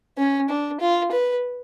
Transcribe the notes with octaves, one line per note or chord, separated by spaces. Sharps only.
C#4
D4
F4
B4